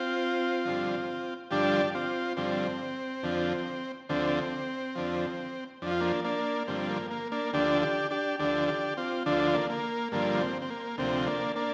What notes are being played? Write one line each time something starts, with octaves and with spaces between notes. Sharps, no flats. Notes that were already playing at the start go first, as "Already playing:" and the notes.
Already playing: C4 F4
G2 D3 F3
G2 D3 F3 D4 G4
C4 F4
G2 D3 F3 C4
F2 D3 F3
D2 D3 F3 C4
F2 D3 F3
F2 F3 D4 F4
A#3 D4
A#3 D4
G2 D3 F3 C4
A#3
A#3
A#3 D4
D2 D3 F3 D4 G4
D4 G4
D4 G4
D2 D3 F3 D4 G4
D4 G4
C4 F4
D2 D3 F3 D4
F4
D4
F4
A#3 D4
A#3
G2 D3 F3 A#3
C4
C4
A#3
D2 C3 F3 C4
A#3 D4
A#3 D4